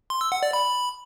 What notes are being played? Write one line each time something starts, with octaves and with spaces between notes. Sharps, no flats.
C6
E6
F#5
D5
B5